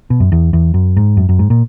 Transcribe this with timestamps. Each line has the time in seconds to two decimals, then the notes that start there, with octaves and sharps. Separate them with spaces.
0.10 B2
0.20 F#2
0.32 E2
0.53 E2
0.74 F#2
0.97 G#2
1.17 F#2
1.29 F#2
1.39 G#2
1.50 A#2